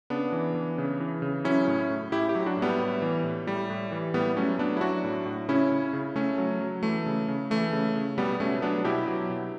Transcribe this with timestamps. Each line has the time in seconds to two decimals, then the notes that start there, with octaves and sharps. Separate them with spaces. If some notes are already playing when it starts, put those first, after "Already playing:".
0.10 C#3 B3 D4
0.32 E3
0.55 E3
0.78 C#3
1.00 E3
1.22 C#3
1.44 F#3 C#4 E4
1.68 A2
1.90 A2
2.12 A2 E4 G4
2.29 E4 G4
2.35 F#3
2.46 D4 F#4
2.57 A2
2.62 G3 B3
2.79 A2
3.02 E3
3.24 A2
3.47 A2 G3
3.70 A2
3.92 E3
4.14 A2 G3 B3
4.36 F#3 A3 C#4
4.58 F#3 B3 D4
4.77 E4
4.81 F#3 D4 F#4
5.04 A2
5.26 A2
5.49 C#3 C#4 E4
5.72 C#3
5.93 C#3
6.15 C#3 A3 C#4
6.38 F#3
6.61 F#3
6.83 E3 A3
7.06 C#3
7.28 C#3
7.51 E3 A3
7.72 C#3
7.96 C#3
8.18 B2 G3 B3
8.40 B2 A3 C#4
8.62 F#3 B3 D4
8.84 B2 E4 G4
9.08 F#3
9.30 B2